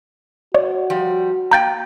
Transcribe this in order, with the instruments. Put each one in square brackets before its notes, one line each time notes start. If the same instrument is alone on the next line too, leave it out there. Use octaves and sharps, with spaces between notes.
[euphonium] F#4 [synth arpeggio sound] C#5 D5
[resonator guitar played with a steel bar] F3 G3
[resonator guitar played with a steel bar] A#3 G5 [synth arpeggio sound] A#5 G6 A6